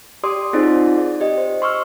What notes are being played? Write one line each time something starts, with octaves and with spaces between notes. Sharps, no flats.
G4 D5 C6 D6 D#6
C4 D#4 F4 G#4 C5 D5
D5
G4 D#5
C5
C6 C#6 E6 F6